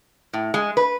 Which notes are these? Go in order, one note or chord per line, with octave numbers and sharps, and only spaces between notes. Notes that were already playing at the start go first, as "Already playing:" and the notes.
A2
G#3
B4